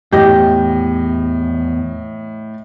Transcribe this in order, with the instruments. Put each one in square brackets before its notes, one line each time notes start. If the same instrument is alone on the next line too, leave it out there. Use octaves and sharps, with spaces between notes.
[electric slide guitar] E2 [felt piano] A2 D#5 A#6 [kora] G4